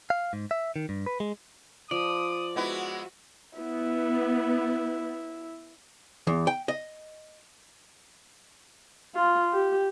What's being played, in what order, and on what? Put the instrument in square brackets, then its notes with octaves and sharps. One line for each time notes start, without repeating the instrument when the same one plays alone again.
[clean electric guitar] F5
G#2
E5
D#3
G2
B4
G#3
[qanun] F3 [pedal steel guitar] D5 [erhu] D#6
[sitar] G#3 B3 E4 [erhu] F#4
[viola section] B3 [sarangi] E4
[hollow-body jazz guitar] E2
G5
D#5
[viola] F4
G4